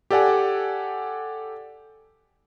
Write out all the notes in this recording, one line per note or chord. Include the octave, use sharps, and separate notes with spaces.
G4 A4 D5 F#5 G#5